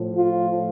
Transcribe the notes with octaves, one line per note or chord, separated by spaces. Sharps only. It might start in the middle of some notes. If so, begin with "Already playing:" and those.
Already playing: A2 F3
F4